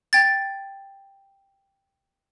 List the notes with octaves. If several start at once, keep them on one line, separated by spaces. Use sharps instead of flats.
G5 G#6 A6